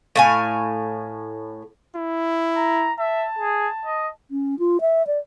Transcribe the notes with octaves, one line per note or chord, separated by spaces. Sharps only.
A2 F5 G#5
E4
A#5
E5 A5
G#4
D#5
C#4
F4
E5
D5